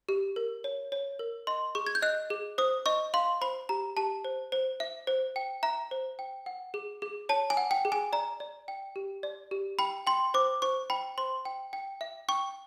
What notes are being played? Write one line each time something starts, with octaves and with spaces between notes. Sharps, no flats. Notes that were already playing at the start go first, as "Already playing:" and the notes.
G4
A#4
C#5
C#5
A#4
D#5 C6
G#4 C#6
G#6
G6
D#5 F#6
G#4
C5 D#6
D#5 C#6
F5 C6
C5 B5
G4 A#5
G4 A5
C5
C5
E5
C5
G5
E5 A#5
C5
G5
F#5
G#4
G#4
C#5 A5
G#5
F#5
G5
G#4
G#5
D5 A#5
D5
G5
G4
D5
G4
G5 B5
G5 C6
C5 D6
C5 C#6
G5 B5
C5 C6
G5
G5
E5
G5 C#6